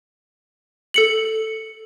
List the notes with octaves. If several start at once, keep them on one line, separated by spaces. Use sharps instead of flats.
A4 C#7 F#7